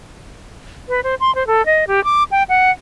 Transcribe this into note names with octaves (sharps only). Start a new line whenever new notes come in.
B4
C5
C6
C5
A4
D#5
G4
D6
G5
F#5